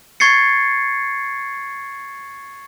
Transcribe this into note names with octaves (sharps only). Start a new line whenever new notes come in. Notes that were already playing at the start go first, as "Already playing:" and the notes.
C#6 G#6 A6 C7 C#7